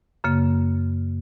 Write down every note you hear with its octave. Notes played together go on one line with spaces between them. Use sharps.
F#2 C#3 A#3